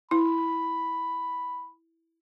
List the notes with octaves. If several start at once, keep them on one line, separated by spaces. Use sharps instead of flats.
E4 B5